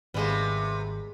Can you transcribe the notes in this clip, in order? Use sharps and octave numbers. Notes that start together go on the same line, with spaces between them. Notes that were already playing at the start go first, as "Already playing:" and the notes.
G#1 C3 G3 G#3 A#3 B3